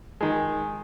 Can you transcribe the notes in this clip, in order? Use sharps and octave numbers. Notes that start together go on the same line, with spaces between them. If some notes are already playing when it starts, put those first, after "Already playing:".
D#3 G#3